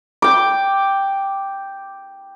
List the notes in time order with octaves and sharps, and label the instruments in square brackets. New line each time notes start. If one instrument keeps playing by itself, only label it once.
[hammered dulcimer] G5 D6